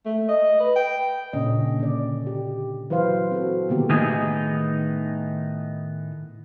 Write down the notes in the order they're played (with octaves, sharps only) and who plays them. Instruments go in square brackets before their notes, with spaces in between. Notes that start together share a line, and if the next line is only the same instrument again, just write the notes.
[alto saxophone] A3
D#5
B4
G5
[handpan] A#2 C#3 C#4 D4 D#5
D3 D5
G4
E3 F#3 B4 C5 F5
C4 F#4 A4
B2 D3 D#3 A#3 B3 G4
[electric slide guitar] A2 D#3 B3 D#4 G#4 G#5